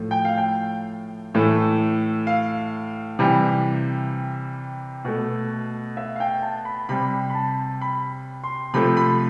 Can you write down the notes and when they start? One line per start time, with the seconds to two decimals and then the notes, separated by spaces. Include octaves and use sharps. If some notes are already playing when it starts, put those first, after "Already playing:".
Already playing: A2 F3 A3
0.11 G5
0.25 F5
0.37 G5
1.34 A2 E3 A3
2.27 F5
3.19 C3 E3 G3
5.05 B2 A3
5.97 E5
6.16 F5
6.20 G5
6.42 A5
6.65 B5
6.89 C3 G3 B5
7.30 B5
7.35 A5
7.81 B5
8.44 C6
8.74 C3 F3 A3 B5
8.97 B5